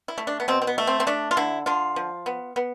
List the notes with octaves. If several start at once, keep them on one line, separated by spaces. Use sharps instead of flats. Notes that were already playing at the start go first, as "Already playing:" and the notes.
E4
A3
D4
B3
B2 C4
C4
B3
A3
C4
C4
A3 D4
F4
D3 E4
D3 F4
F3
B3
B3